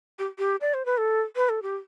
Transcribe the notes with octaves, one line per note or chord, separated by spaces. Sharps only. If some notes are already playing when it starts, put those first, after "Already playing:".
G4
G4
D5
C5
B4
A4
B4
A4
G4